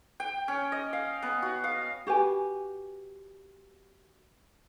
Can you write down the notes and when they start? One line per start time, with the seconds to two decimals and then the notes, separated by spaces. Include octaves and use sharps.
0.20 G5
0.48 C#4
0.72 D#5
0.93 F5
1.22 B3
1.42 F#4
1.64 F5
2.07 F#4 G4 B4 G#5